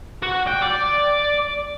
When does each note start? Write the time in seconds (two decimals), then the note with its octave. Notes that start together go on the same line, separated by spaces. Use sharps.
0.23 F#4
0.47 G5
0.62 D5